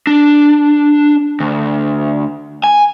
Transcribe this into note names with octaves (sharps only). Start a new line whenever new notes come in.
D4
D2
G#5